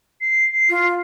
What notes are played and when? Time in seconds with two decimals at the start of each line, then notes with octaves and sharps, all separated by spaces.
0.21 C7
0.69 F4